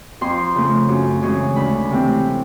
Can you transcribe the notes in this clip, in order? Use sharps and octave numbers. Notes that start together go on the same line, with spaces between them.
F2 C6
C#3 F3 A3
F#2
C#3 E3 G#3 C#4
D2 B5
C3 E3 A3 C4